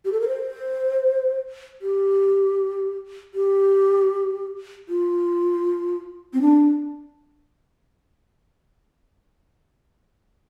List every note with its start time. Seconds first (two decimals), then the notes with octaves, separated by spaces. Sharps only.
0.05 G4
0.12 A4
0.21 A#4
0.28 C5
1.82 G4
3.35 G4
4.89 F4
6.33 C4
6.41 D4